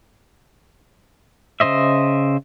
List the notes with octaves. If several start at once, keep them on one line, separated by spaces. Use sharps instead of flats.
C#3 F3 C5 D#5 E5